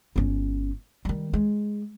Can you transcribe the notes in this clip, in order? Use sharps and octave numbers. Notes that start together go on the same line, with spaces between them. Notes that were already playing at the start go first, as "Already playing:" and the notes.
G1 C#4
D#3 G3
G#3